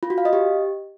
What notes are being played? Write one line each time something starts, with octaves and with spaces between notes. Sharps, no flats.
F4
F#4
F5
D#5
G4